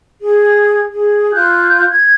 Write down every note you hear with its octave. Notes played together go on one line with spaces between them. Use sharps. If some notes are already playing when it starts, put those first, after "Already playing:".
G#4
G#4
F4 F#6 G6
G#6